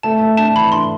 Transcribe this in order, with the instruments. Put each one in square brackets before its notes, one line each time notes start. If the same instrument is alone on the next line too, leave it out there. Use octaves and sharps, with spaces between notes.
[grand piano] A3 [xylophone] A5
[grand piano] A3
[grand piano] D4 [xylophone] A5
[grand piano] E3 [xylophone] B5
[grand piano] D4 [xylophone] C6